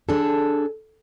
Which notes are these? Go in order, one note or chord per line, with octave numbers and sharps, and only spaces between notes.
D4 G#4 A4